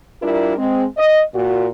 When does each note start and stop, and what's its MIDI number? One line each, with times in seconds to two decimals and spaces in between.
0.22 0.54 55
0.22 0.54 62
0.22 0.54 64
0.22 0.54 65
0.22 0.54 70
0.57 0.84 56
0.57 0.84 60
0.97 1.21 75
1.34 1.67 46
1.34 1.67 66